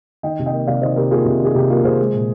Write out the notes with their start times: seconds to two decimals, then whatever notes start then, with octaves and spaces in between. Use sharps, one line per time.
0.23 D#3 D#5 G5
0.39 C3
0.46 D#5 G5
0.53 A#3
0.67 C3 D5 F5
0.82 D#3 C5 D#5
0.96 C3 G4 A#4
1.11 A#3 F4 G#4
1.25 C3
1.40 D#3 G#4
1.54 C3 G4
1.70 A#3 F4
1.84 C3 G#4 C5
1.99 G#3
2.14 A#2